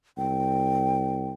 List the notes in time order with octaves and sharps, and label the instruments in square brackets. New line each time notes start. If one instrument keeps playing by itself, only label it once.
[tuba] C2 [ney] G5